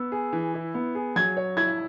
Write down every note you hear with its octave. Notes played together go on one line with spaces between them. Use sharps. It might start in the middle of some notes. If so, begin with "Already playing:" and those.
Already playing: B3 E6
G#4
E3
E4
B3
G#4
F#3 G#6
C#5
E4 G#6